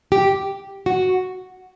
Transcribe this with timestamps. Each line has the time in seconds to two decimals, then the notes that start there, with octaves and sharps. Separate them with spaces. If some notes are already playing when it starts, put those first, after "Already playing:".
0.12 G4
0.86 F#4